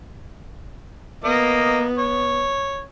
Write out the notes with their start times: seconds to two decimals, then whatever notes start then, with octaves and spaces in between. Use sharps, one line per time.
1.24 A#3 B3 D#5
1.98 C#5